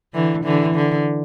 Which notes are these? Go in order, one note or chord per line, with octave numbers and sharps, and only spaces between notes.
D3 E3
D3 E3
D3